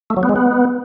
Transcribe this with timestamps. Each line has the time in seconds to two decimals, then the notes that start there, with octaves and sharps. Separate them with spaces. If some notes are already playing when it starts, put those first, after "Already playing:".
0.10 A3
0.17 F#3
0.23 B3
0.29 G#3
0.36 B3